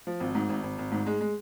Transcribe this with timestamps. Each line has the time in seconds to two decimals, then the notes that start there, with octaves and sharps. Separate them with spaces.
0.07 F3
0.20 G#1
0.35 G#2
0.49 G#1
0.63 G#1
0.78 G#1
0.91 G#2
1.06 G#3
1.21 G#3